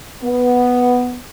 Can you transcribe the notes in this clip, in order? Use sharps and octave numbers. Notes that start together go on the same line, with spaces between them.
B3